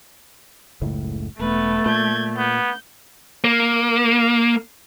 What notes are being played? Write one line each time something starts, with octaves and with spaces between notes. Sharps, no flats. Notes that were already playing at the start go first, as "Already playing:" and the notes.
F#1 C#2 A2
E1 A3 B3 B4
A#2 G6 G#6
B3 G6
A#3